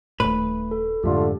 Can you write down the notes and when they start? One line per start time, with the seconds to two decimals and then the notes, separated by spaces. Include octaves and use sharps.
0.20 D#1 A2 A3 B4
0.71 A4
1.04 F2 G#2 D3 A3 F4 G4